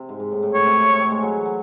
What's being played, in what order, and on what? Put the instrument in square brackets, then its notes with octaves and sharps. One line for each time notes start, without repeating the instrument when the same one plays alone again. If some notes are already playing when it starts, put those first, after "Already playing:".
Already playing: [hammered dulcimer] C3
G#2
G#2
A2
A2
[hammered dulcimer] A2 [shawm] C#5
[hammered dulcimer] C3
A2
A2
A2
G#3
F#3
E3
F#3